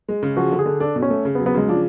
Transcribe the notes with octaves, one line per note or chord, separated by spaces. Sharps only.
G#3
C#3
F3 F#4
D3
G#4
D3
D4 A4
B2
C#4
A3
C#3
B3
F#3
B3
C#3 G#3
F3 D4